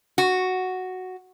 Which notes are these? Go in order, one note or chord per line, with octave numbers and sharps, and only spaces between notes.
F#4